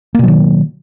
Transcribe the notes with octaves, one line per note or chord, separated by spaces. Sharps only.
B2 D#3 F#3 A#3